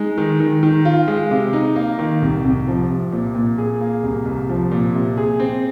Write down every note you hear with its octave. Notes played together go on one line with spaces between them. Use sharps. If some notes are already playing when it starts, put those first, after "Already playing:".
Already playing: G#3 D#4
D#3
D#3
D#3
F4
G#3
C3
D#4
A#3
D#3
C2
C2
F3
C3
A#2
A#2
G#4
A#3
C2
C2
F3
A#2
C3
G#4
C4